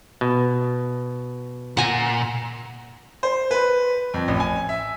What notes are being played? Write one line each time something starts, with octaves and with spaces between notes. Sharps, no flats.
B2
A#2 F#5 G#5 A#5
C5
B4
F2
A1
G#5
E5